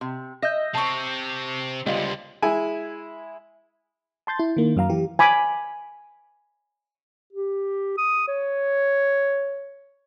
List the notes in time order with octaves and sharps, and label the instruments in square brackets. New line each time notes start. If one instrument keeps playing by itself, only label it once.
[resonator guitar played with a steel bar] C3
[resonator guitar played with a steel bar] D#5 E5 [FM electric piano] G6 A#6
[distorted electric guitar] C3 C4 [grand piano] A5 C#6
[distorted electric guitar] C#2 D3 [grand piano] G3 [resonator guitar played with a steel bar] B3 F4 C5 [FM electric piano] G4 D#5
[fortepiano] G#3 E4 G#5
[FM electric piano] A5 C6 G6 A6
E4
D#3 A#3
F#2 F#3 F5 A#5
E3 G4
[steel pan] G#5 B5 D6
[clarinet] G4
D#6
C#5